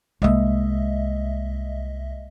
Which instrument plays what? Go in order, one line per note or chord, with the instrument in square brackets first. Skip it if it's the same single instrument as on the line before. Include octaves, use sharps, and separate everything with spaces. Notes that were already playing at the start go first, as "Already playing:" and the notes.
[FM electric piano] C2 D#5 E5 [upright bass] G#3 A#3